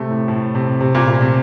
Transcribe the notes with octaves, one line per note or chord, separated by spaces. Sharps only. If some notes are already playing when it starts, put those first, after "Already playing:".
Already playing: C3 A3
A2
A2
C3
C3
A#2
A#2
C3